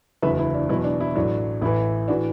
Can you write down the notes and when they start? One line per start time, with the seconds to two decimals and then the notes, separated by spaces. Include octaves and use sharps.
0.22 F#1 E2 D3 F#3 B4 E5
0.39 E4
0.54 D4
0.69 E2 B2 F#3 E4
0.84 D4
1.01 E4
1.15 A1 A2 F#3 D4
1.62 A1 A2 E3 E4
2.08 A2 E3 D4 F#4